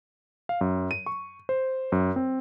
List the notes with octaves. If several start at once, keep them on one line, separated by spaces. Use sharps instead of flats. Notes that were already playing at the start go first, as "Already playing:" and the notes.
F5
F#2
D#7
C#6
C5
F#2
C4